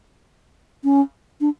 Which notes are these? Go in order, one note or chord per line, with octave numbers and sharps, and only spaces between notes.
C#4
D4